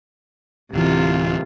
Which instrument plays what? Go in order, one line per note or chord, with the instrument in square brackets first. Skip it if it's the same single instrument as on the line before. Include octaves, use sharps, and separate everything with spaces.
[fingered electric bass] D1 E3 [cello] C3 F4